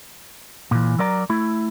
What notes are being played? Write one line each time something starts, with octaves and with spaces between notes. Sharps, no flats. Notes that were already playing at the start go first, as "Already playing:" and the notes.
A#2 E3
F#3 A#4 D5 A#5
A3 E4